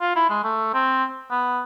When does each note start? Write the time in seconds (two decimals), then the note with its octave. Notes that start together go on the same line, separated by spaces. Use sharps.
0.01 F4
0.15 E4
0.29 G#3
0.44 A3
0.73 C4
1.30 B3